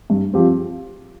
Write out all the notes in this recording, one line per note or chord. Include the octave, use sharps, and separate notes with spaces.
G2
F3 C4 G4